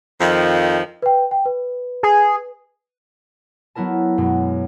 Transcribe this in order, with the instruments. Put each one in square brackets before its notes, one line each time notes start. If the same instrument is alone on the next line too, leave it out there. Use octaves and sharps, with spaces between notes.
[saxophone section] F2 D#3 F3
[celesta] B4 G5
G5
B4
[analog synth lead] G#4
[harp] F#3 B3 E4 A#4 A5
F#2 B2 G#3